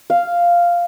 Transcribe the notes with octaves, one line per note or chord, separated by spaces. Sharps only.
F5